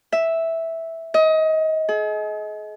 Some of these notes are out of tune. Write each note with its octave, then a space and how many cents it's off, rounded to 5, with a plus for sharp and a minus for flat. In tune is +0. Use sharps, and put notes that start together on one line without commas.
E5 -5
D#5 +25
G#4 +40